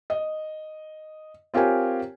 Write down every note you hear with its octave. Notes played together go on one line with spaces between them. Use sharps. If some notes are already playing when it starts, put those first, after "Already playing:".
D#5
C4 F4 G4 A#4 C#5 G#5